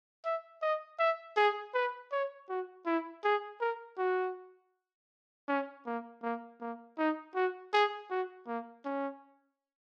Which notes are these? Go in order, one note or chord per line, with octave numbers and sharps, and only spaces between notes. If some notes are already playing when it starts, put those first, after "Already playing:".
E5
D#5
E5
G#4
B4
C#5
F#4
E4
G#4
A#4
F#4
C#4
A#3
A#3
A#3
D#4
F#4
G#4
F#4
A#3
C#4